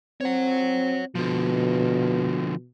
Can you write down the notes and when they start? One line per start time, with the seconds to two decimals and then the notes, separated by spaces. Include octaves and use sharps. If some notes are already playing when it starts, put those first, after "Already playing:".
0.21 C4 C#5 F#5
1.15 B2 D3 F3